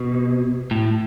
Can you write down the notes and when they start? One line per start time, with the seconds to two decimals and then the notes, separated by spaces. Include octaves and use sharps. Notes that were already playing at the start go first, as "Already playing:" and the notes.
Already playing: B2
0.71 A2